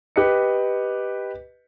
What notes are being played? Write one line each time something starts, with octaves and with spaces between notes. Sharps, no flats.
G4 B4 D#5 C#7